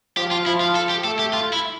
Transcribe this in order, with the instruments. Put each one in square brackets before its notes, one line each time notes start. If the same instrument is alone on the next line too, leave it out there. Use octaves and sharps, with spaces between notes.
[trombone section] F3 [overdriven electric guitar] G4
[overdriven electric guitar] F4
[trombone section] F3 [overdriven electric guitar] E4
[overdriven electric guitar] F4
A4
G4
[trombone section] A3 [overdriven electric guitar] A4
[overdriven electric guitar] G4
F4
E4